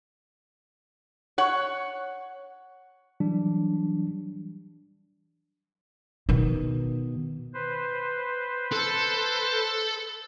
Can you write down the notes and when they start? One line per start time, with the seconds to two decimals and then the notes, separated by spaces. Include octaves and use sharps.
1.38 C#5 F#5
3.20 E3 F#3 G3 D4
6.29 B2 D#3
7.54 B4 C5
8.72 A4